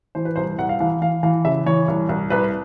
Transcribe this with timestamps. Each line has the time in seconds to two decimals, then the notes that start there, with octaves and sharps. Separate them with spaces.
0.15 E3 C5
0.25 B4
0.36 C2 C5
0.58 C2 F#5
0.69 F5
0.80 E3 F5
1.02 E3 F5
1.23 E3 F5
1.45 C#3 E5
1.66 E3 C#5
1.88 C2
2.09 C2
2.30 C2 B4